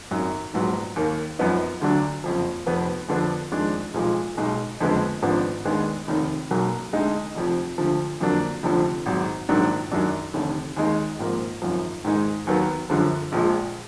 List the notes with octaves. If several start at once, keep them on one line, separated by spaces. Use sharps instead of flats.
G#1 F#2 D#3 F#3
A#1 G#2 F#3 B3
D#2 D#3 A#3
F#2 F3 B3 D#4
D2 D3 F#3 D4
F#1 F2 F3
F1 F2 F3 B3
F2 D3 F3 B3 D4
F2 D#3 G#3 D4
B1 A#2 F3 G#3
B1 B2 G#3 D#4
F#1 F2 D3 G#3 B3
G#1 G#2 F3 B3 D4
D#2 D#3 G#3 B3 D4
F1 D#2 D#3
B1 B2 F#3 A#3
D2 D3 G#3 D#4
F1 F2 F3
D2 D3 F3
F2 D3 F#3 A#3 D4
F1 F2 D3 F3
G#1 G#2 F#3
A#1 G#2 D#3 F#3 D4
F#2 D#3 F#3 D4
F1 D#2 D3
D#2 D#3 G#3 D#4
G#1 G#2 F3 A#3
G#1 F#2 F3
G#2 D#3 G#3 D#4
D#2 D#3 F#3 B3
F#2 D3 F3
A#1 A#2 F3 G#3